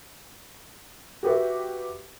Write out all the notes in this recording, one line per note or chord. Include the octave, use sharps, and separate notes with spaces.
F#4 G4 B4 E5